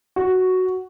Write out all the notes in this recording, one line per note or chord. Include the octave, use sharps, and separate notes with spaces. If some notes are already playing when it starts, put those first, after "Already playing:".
F#4